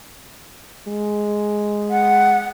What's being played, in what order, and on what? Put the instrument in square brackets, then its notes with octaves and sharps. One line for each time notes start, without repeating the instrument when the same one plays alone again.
[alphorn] G#3
[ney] F#5